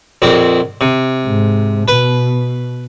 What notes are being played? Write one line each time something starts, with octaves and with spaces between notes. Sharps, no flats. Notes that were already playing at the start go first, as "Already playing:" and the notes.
A#1 F2 C4
C3
G#2
B2 B4